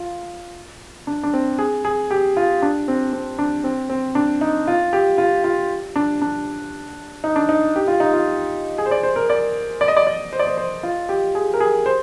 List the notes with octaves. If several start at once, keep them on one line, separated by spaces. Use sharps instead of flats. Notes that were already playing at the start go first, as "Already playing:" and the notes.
Already playing: F4
D4
D4
C4
G#4
G#4
G4
F4
D4
C4
C4
D4
C4
C4
D4
D#4
F4
G4
F4
F4
D4
D4
D#4
D4
D#4
G4
F4
D#4
F4
G#4
C5
D5
C5
A#4
D5
D5
D#5
D5
D5
C5
D5
C5
C5
F4
G4
G#4
A#4
G#4
C5